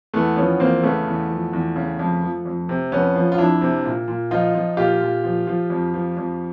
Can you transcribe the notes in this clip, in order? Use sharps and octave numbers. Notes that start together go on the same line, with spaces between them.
E2 A3 B3
F3 B3 C#4
E2 A#3 C4
C#3 A3 B3
E2
F3
E2
C#3
F2
F3
F2
C3
F2 B3 C#4
F3
F4
F2 D4 E4
C3
A#2
A#2
F3 D#4 F4
F3
A#2 F4 G4
A#2
F3
F3
F2
F3
F2